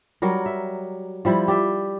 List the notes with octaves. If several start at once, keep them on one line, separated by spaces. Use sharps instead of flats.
F#3 G3 A#4
E5
F3 G3 E4
G4 D5 E5